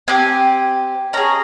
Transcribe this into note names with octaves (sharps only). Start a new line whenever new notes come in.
C4 G4 G#5
C#4 G#4 A#5